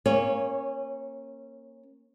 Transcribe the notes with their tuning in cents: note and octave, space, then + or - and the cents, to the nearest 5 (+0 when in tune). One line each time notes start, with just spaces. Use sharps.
A#3 +0 C#4 -25 C#5 +0